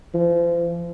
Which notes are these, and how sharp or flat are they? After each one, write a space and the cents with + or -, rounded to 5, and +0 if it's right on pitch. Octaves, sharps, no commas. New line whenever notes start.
F3 -35